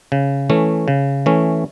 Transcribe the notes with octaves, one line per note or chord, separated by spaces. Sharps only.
C#3
E3 A3 C#4
C#3
E3 A3 C#4